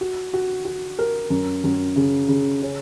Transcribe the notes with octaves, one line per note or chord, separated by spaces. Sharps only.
F#4
F#4
F#4
A#4
F#2
F#2
C#3
C#3
C#4